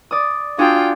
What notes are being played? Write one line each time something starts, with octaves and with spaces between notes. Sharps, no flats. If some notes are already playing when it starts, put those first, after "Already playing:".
D5 D#6
D4 F4 F#4 G#4 G5